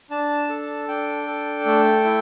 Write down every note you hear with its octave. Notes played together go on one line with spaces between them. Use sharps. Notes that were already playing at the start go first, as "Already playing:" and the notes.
D4 A5
A4
D4 G5
A4
A3
E4